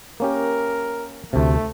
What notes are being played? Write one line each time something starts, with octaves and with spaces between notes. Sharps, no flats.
A#3 C#4 G4 A#4
D2 C3 A3